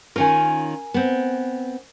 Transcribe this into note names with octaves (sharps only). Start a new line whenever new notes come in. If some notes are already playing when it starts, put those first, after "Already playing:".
D#3 C#4 F4 A#4 G#5
B3 C4